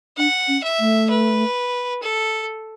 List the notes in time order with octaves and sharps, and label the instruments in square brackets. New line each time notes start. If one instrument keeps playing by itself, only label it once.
[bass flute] D4 [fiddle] F#5
[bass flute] C#4
[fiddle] E5
[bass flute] A3
[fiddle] B4
A4